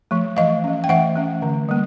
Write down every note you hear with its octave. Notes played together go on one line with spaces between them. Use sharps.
F3 A3
E3 D#5 F5
A3 C#4
G5
E3 E5 F#5
A3 C#4
D3
G3 A#3